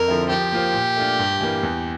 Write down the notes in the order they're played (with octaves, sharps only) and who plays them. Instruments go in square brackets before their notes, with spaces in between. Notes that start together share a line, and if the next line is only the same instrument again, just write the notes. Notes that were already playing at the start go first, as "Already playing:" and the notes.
Already playing: [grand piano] F2 [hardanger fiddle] A#4
[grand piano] D3 F3 C4 E4
[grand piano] F3 [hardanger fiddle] G4
[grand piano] A#3 F4 C5
A#2
A3 D4 F4
G2
E3 G3 A#3
E2